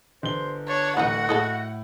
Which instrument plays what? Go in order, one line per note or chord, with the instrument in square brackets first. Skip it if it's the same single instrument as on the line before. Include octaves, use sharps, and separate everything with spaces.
[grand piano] G1 G7 [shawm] C5
[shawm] D4 [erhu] C#5
[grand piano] D1 A2 [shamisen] F#3 G3 D#4 [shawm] F#4 [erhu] F#5
[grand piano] A2 E4 [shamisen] G#4 A4 D#5